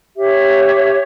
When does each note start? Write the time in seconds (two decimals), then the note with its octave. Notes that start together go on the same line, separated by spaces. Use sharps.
0.17 G4 C#5 E5